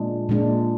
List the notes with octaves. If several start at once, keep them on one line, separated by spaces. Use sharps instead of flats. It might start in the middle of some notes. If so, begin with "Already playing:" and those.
Already playing: A#2 G#3 D4
A#2 G#3 D4